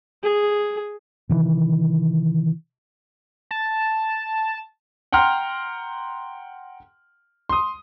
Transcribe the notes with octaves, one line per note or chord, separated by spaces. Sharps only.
G#4
C3 D#3 E3
A5
F#5 G5 A#5 C6 F6
C6 D#6